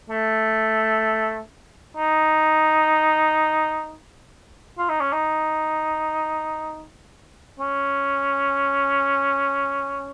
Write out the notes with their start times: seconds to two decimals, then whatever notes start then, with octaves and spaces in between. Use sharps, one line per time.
0.10 A3
1.97 D#4
4.78 F4
4.89 D#4
5.01 C#4
5.13 D#4
7.60 C#4